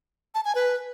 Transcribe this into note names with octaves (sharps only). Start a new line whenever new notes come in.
A5
G#5
B4